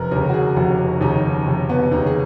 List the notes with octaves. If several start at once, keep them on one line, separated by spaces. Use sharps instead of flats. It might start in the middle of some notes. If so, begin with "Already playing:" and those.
Already playing: F1 A#4 B4
D#2 C#3 A#4
F#4
G#4
F1 F#4
D#2 C#3 D#4
F1
B3
D#2 C#3 D#4
G#4